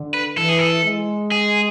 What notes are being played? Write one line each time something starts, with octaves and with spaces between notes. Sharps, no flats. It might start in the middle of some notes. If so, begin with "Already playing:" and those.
Already playing: D3
B4
E3 A4
G#4
A4
G#3
G#4